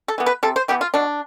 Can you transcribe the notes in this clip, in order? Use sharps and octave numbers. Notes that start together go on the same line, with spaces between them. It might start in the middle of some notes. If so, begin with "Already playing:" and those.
A4
E3 B3
B4
C3 A4
C5
E3 B3 G4
F4
B2 D4